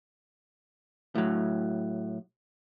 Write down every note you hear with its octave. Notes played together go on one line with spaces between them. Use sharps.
A2 F#3